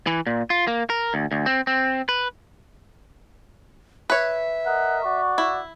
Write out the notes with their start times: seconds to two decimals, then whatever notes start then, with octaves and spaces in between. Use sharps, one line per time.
0.07 E3
0.27 A#2
0.50 F4
0.67 A#3
0.90 A#4
1.14 D2
1.31 D2
1.46 C4
1.67 C4
2.09 B4
4.10 B4 C#5 E5
4.66 A#4 D#5 F#5
5.04 F#4 D5 C#6
5.38 E4